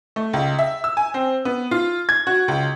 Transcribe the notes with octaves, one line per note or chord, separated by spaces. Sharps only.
A3
C#2
E5
E6
G#5
C4
B3
F4
G#6
F#4
C#2